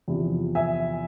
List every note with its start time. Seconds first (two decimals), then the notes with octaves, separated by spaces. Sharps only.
0.08 E2 C3 F3
0.55 E5 G#5